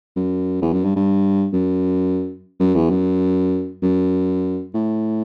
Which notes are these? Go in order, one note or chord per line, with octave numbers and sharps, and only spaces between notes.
F#2
E2
F#2
G2
G2
F#2
F#2
E2
F#2
F#2
A2